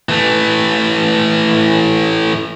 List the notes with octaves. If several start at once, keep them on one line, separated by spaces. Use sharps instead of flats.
E3 A3